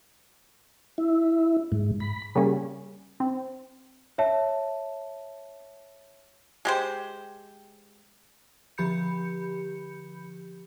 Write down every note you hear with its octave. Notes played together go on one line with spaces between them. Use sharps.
E4
G#2
B5
C#3 G3 A#3 C#4
C4
C#5 E5 A5
G#3 G4 C5
D3 F3 G4 B5 G6 C#7